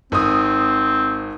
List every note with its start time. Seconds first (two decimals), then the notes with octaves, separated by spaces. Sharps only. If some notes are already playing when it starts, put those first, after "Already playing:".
0.12 G#1 C4 D#6